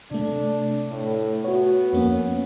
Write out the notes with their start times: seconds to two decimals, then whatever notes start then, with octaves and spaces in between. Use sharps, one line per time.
0.11 C3 A3 D4
0.91 A2
1.44 B3 F#4 C#5
1.93 F2 A#3 C#4